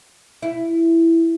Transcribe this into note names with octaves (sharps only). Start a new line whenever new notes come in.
E4